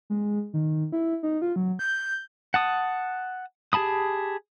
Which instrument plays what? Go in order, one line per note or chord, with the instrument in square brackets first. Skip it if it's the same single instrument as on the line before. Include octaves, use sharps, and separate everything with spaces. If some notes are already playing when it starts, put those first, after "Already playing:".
[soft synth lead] G#3
D#3
E4
D#4
F4
F#3
G6
[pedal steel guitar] F#5 A5 D#6
G4 G#4 A5 B5 D#6